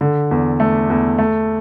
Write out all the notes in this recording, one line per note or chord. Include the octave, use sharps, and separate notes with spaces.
D3
E2
A3
E2
A3